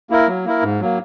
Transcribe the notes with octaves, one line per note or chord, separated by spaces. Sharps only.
A#3 E4 A#4
F#3
A#3 E4 A#4
G#2
F#3 A#3